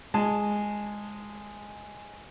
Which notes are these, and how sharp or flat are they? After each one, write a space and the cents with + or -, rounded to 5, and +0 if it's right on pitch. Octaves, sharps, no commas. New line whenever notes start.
G#3 -5 A5 +0